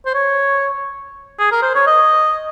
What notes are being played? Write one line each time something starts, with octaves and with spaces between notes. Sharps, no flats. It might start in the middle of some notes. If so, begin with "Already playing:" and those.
C5
C#5
G#4
A#4
C5
C#5
D#5